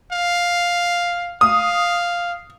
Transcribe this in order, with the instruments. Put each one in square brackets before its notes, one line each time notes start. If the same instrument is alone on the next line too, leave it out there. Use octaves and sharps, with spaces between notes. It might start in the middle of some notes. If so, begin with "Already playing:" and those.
[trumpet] F5
[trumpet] F5 [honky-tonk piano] D#6